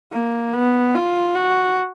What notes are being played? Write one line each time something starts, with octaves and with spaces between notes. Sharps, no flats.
A#3
B3
F4
F#4